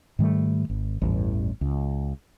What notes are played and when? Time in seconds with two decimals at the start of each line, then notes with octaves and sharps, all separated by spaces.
0.19 G#2 D#3 G3 A3
0.70 G#1
1.02 A1 E2 G2
1.61 C#2